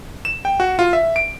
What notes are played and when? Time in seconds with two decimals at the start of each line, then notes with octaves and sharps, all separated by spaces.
0.25 E7
0.45 G5
0.60 F#4
0.79 F4
0.93 E5
1.16 D7